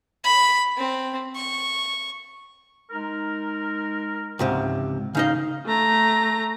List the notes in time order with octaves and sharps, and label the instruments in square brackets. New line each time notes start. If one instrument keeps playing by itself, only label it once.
[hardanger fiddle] B5
C4
C#6
[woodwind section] G#3 D#4 A#4
[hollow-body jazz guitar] C#2 G#2 C3
[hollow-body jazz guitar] C#3 D#4 D#5 [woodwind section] F5
[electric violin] A3 A#5